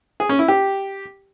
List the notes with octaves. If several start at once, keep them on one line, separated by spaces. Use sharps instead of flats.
G#4
C#4
E4
G4